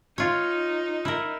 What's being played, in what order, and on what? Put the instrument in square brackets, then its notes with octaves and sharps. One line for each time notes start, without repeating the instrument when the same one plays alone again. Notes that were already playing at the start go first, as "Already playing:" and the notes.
[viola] D#4 [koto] F4 C#5
[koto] E4 A#4